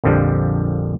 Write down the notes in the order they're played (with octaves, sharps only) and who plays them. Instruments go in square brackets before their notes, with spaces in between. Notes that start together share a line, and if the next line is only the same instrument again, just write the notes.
[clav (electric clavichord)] A#1 F2 D3 F3 G3